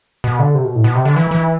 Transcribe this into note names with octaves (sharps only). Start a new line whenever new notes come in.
B2
D3
C3
B2
A2
B2
C3
D3
E3
E3